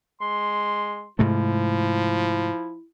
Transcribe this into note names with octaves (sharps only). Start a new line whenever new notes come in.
G#3 C6
G#2 C3 F3 A3 E4